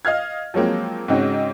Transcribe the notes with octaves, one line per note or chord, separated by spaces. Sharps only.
D#5 F5 F6 G#6
F3 F#3 G#3 A#3 C4
G#2 C#3 C4 C#4 D#4 F#4